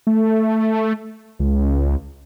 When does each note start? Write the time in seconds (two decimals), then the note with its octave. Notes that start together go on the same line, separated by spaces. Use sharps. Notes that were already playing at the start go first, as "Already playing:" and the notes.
0.07 A3
1.39 C#2